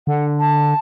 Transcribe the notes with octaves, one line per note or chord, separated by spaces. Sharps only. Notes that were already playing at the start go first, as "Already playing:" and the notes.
D3 F#5
A5